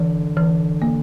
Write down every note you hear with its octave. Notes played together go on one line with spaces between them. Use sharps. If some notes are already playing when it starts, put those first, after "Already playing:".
Already playing: D3 E3
E3
A#3